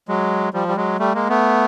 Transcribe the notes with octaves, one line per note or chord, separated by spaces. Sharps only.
F#3 G#3
F3 G3
G3
F#3 G#3
G3 A3
G#3 A#3
A3 B3